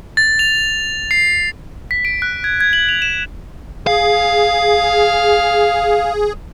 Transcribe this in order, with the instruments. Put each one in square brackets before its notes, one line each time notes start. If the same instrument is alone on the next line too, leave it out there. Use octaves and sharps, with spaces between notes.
[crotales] A6
F7
C7
B6
D7
F#6
G#6
G#6
F#7
F7
E7
[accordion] G#4 [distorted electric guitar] F5